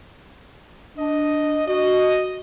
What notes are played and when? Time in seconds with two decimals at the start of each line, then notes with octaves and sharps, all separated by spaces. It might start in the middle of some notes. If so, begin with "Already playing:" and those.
0.98 D4 D#5
1.68 F#4 D#5